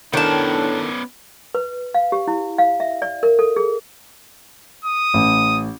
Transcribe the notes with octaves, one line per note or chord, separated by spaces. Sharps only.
A2 D#3 B3 C#4 D4 D5 A5
B4
F5
G4
E4
F5
E5
D5
A#4
A4
G#4
D#6
A1